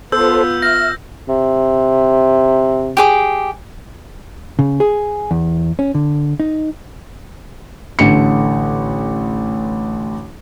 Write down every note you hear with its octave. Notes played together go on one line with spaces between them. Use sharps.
B3 F4 A4 C5 E6 G6
E5 F6 A#6
C3
G4 G#4 D6
C#3
G#4
E2
C#4
D3
D#4
A1 D3 C#7